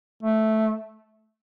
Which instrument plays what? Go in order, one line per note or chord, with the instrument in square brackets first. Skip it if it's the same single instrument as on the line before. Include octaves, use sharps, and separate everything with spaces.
[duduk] A3